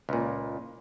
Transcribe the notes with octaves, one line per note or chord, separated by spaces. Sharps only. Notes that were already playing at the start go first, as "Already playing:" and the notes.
C#2 A#2